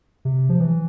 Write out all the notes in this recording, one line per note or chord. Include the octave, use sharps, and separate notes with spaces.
C3
F3
E3